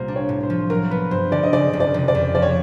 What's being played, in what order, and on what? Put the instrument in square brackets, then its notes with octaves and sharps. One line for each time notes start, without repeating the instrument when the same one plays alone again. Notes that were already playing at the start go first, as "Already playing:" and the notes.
Already playing: [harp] C2 A#2 G3 A#3 [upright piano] C5
[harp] D4
[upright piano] C#5
[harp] A2
[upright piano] C5
[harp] F3
[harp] F#3 [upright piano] A#4
[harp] B3 [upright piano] B4
[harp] G2 [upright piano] C5
[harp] D3 [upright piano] D5
[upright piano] D#5
[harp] C#3 [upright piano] D5
[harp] F1
[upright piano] D5
[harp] F1
[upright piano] D5
[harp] F2
[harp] F3 [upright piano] D5
[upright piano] C#5